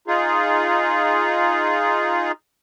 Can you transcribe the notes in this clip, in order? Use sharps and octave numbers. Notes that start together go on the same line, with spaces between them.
D#4 F4 G#4